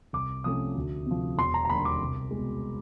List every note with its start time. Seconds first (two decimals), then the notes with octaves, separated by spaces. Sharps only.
0.13 C2 D6
0.44 C3 F3 A3 C#4 D#6
0.75 D2
1.06 C3 F3
1.37 E1 C6
1.54 A#5
1.65 A#5
1.69 D#2 D3 G3 B5
1.85 D6
2.01 C2
2.31 B2 G#3